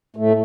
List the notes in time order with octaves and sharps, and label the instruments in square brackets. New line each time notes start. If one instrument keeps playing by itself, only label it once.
[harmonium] A2 A3